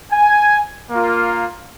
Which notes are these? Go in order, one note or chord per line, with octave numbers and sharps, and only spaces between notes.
G#5
A#3 F4